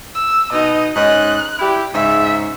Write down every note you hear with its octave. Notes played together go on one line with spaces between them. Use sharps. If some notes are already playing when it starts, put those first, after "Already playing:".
E6
B2 D#4 D#5
G#2 C#4 D#5 F#6
E4 G4
G#2 C#3 E5